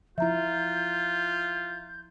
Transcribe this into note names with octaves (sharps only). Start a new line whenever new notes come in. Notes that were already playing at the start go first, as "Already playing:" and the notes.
F3 E4 F4 E5 A#5 G6